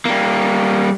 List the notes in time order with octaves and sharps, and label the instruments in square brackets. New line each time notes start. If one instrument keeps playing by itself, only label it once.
[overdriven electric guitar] G3 A#3